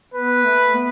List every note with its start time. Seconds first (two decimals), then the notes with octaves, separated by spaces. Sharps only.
0.14 B3 B4
0.45 A3
0.74 B3